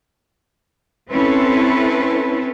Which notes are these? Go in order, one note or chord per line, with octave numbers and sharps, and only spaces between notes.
C4 C#4 E4 A4 B4 C5